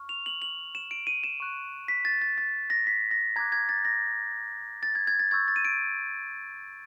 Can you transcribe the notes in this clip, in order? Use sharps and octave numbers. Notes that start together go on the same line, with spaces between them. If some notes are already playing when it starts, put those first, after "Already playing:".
Already playing: C#6 F6
F7
F#7
F#7
E7
D7
D#7
E7
C#6 F#6
B6
A6
A6
A6
A#6
B6
A#6
A#5 D6 F#6 G#6
G#6
A6
A#6
A6
G#6
G#6
A6
C#6 E6 G6 G#6
A6
D#7
D7